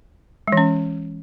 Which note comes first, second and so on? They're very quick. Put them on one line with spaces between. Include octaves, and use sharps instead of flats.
G#3 E3 C#4